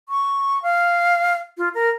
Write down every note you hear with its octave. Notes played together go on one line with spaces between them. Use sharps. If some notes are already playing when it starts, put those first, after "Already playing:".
C#6
F5
F4
A#4